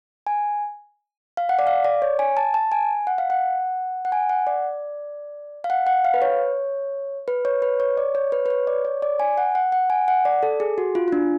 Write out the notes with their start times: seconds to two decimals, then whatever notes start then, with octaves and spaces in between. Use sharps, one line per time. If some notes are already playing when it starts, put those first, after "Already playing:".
0.27 G#5
1.37 F5
1.49 F#5
1.59 D5
1.67 F5
1.84 D5
2.02 C#5
2.19 G#5
2.37 A5
2.54 A5
2.72 G#5
3.07 F#5
3.18 F5
3.30 F#5
4.05 F#5
4.12 G#5
4.29 F#5
4.47 D5
5.64 F5
5.70 F#5
5.87 F#5
6.05 F5
6.14 B4
6.22 C#5
7.28 B4
7.45 C#5
7.62 B4
7.80 C#5
7.97 D5
8.15 C#5
8.32 B4
8.46 B4
8.50 C#5
8.67 D5
8.85 C#5
9.02 D5
9.20 G#5
9.38 F#5
9.55 F#5
9.72 F#5
9.90 G#5
10.08 F#5
10.25 D5
10.43 A4
10.60 G#4
10.78 F#4
10.95 F4
11.08 F4
11.12 D4